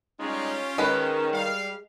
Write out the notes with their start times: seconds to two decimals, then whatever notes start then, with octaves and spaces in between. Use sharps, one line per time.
0.20 G3 G#3 C#4 D#4 F4 G4
0.78 D#3 G#3 B4
1.33 G3 F5